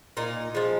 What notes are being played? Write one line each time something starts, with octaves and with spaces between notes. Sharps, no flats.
A#2 D#4
F3 G#3